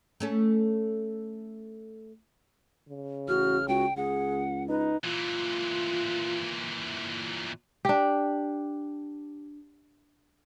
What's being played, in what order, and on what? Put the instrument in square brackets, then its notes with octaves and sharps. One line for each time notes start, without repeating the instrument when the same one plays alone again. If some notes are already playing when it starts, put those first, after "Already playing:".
[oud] A3 C#4 A4
[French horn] C#3
[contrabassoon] A1 [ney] F#4 [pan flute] F6
[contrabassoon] C#2 [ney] F#4 [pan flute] G5
[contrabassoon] C#2 [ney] G#4 [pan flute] F#5
[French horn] D#4 [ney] B4
[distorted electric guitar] A#2 E3 [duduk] F4
[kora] D4 G4